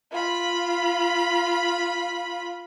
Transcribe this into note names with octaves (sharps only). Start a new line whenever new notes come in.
F4 B5